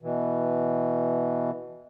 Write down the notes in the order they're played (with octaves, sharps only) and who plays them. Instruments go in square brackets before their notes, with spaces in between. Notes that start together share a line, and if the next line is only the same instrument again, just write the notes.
[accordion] B2 E3